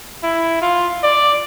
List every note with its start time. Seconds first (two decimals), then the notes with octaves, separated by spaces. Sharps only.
0.23 E4
0.62 F4
1.03 D5